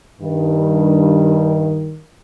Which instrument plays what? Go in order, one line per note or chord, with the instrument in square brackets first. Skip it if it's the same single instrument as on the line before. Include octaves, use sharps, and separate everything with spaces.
[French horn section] G2 D#3